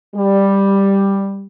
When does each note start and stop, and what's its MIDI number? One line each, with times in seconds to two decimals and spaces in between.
0.15 1.47 55